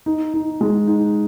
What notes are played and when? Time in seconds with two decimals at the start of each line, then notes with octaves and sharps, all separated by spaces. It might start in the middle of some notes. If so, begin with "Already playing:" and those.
0.06 D#4
0.34 D#4
0.61 G#3
0.87 D#4